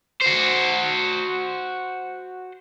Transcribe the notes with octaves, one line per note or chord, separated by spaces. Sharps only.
F#4 C5